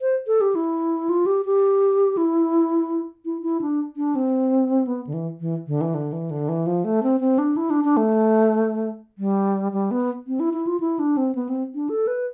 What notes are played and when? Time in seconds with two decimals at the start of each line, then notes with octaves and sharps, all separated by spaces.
0.01 C5
0.27 A4
0.41 G4
0.55 E4
1.09 F4
1.26 G4
1.45 G4
2.17 E4
3.25 E4
3.42 E4
3.61 D4
3.96 D4
4.15 C4
4.87 B3
5.07 D3
5.14 E3
5.40 E3
5.67 D3
5.81 E3
5.94 D3
6.13 E3
6.31 D3
6.49 E3
6.67 F3
6.84 A3
7.03 C4
7.20 C4
7.38 D4
7.57 E4
7.70 D4
7.84 D4
7.97 A3
9.18 G3
9.72 G3
9.91 B3
10.27 C4
10.40 E4
10.54 E4
10.67 F4
10.80 E4
10.99 D4
11.17 C4
11.35 B3
11.49 C4
11.75 D4
11.89 A4
12.07 B4